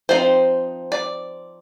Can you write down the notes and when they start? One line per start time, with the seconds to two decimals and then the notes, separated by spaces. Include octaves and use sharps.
0.09 F3 C4 D#4 C5
0.92 D5